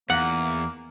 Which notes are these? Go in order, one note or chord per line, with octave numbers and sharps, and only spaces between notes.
E2 A#3 F#5